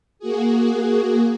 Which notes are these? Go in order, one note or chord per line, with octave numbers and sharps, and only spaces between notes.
A#3 F#4 G#4